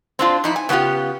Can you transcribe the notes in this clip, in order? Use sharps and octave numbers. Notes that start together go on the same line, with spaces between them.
C4 D4 F4
F2 D#4 E4
G#5
C#3 B3 E4 F4 G4